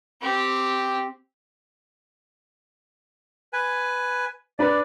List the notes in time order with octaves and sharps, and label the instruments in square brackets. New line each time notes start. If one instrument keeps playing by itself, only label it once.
[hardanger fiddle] C4 G4
[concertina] B4 G#5
[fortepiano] D4 B4 [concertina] D5